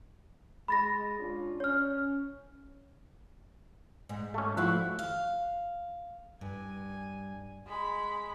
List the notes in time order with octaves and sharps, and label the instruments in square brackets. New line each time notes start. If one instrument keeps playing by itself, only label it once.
[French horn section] G#3 [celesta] B5 A6 A#6
[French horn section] C#4 D4 F4
[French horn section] C#4 [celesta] C#5 F6
[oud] G#2
[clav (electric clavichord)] A3 C#4
[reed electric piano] F3 [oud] A3 E4 F5 [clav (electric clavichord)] F#4 E5 [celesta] F#6
[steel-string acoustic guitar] F5
[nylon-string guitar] G2 [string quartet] G#5
[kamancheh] G#3 B5